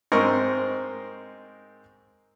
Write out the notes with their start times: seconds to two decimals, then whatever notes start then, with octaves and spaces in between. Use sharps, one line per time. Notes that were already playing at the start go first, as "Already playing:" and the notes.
0.12 G#2 C4 A#4 D#5 C#6